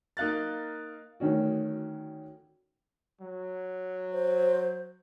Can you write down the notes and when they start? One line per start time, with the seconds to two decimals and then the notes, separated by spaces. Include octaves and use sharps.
0.17 A#3 D#4 F5 F#6 A6
1.20 D2 D#3 C#4 F#4
3.21 F#3
4.13 C5